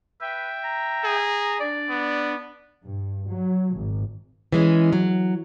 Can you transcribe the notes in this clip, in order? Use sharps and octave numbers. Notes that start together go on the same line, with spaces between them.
B4 E5 G5
A#5
G#4
D4 D5
B3
G2
F#3
G#1
E3 G#3 C#4
F#3